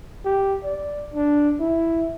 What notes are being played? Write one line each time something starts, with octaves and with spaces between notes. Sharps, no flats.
G4
D5
D4
E4